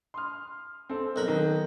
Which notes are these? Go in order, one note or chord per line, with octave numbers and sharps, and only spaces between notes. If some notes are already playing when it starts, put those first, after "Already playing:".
C6 D#6 F6
C4 A4
B1 A#4 B5 F#6
D#3